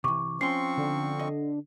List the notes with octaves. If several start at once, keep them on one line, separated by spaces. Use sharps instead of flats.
C3 E3 C#6 D6
F3 C4 C#4 C6 C#6 C7
D3
D#5